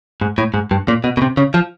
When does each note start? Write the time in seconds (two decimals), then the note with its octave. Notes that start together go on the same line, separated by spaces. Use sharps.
0.21 G#2
0.38 A2
0.54 G#2
0.71 G2
0.88 A#2
1.04 B2
1.17 B2
1.22 C3
1.37 C#3
1.54 F3